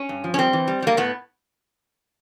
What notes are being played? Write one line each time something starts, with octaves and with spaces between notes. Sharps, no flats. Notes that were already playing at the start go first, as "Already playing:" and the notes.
Already playing: C#4
G2
F3
C#4
G3 C4
E3
G3
G3 A#3
A2 B3